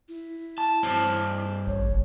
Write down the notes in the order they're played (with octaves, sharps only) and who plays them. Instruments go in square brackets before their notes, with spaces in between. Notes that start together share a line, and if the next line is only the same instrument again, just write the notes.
[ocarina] E4
[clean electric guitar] A5
G2 C5 A5
[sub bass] A1 [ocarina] C#5
[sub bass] F#1